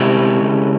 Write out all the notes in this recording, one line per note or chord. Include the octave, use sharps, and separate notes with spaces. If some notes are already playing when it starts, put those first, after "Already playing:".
Already playing: C3 G#3 C#4 E4 G4
C#3